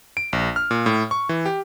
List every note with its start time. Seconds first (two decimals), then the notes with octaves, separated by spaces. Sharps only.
0.17 D7
0.33 A#1
0.56 F6
0.71 A#2
0.86 A2
1.11 C#6
1.29 E3
1.46 G4